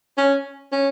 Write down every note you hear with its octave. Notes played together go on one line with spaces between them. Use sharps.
C#4
C#4